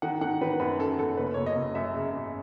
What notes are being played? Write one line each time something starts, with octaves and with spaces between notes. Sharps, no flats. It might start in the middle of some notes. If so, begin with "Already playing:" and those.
D#3 F#5
D#3 F#5
D#3 B4
F#2 B4
C#4 A4
F#2 A4
F#1 B4
F#1 C#5
D#5
F#1
F#2 E5
C#3
F#2